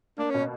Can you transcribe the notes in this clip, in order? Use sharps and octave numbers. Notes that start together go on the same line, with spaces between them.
A#3 D4
B2 C#4